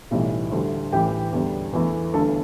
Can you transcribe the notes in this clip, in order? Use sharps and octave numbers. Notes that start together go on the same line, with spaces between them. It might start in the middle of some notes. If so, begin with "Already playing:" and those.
B1 A2 E3 G3
D2 D3 G3
A1 A2 E3 G4 G5
E2 D3 G3
E2 E3 A3
G1 G2 E3 A3 A4 A5